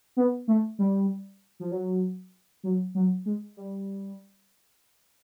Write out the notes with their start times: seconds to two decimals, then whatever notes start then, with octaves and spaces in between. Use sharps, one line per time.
0.17 B3
0.48 A3
0.79 G3
1.60 F3
1.71 F#3
2.63 F#3
2.95 F#3
3.26 G#3
3.57 G3